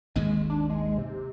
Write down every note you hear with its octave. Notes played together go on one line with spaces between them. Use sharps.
G#1 D#2 G#2 G#3
D4
G#3
C3